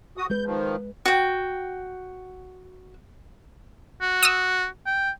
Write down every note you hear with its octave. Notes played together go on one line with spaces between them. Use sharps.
F#4 D#6
G#3 B4 G6
D#3 F3
F#4 G5
F#4
D#6 E6
G5